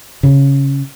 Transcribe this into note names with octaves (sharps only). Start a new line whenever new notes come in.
C#3